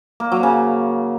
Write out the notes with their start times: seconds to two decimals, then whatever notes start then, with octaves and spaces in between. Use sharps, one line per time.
0.20 A#3
0.32 F#3
0.43 C#3